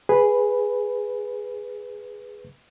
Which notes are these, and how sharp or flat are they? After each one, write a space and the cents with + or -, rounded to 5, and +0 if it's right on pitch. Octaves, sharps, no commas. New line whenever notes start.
G#4 +0 B4 +0